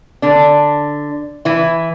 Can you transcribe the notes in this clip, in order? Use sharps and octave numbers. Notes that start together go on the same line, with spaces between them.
D3 D4
E3 E4